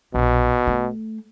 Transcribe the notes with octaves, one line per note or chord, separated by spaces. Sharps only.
A#1 B2
A3